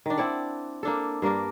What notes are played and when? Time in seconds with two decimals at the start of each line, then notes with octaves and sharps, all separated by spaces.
0.06 D#3 D4
0.17 C4 E4 D5 F#5
0.83 A#3 D4 A4
1.22 G2 A#3 D4 A#4